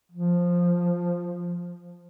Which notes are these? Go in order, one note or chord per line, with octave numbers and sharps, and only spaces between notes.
F3